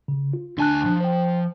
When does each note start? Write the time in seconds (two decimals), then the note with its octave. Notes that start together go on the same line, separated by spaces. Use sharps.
0.08 C#3
0.33 F4
0.58 D2 D4 G#5 A5 F#6
0.86 F3
1.00 C5 G5